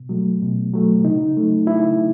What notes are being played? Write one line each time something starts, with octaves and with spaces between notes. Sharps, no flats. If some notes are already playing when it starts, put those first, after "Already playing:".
Already playing: B2
F#3 A3
B2
F#3 A3
C#3 D#4
F#3 A3
C#3 E4